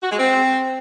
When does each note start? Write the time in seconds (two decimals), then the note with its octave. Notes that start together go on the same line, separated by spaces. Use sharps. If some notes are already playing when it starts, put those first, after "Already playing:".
0.02 F#4
0.10 G#3
0.18 C4